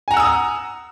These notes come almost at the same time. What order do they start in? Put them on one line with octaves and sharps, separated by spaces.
G#5 A#5 F#5 E6 D#6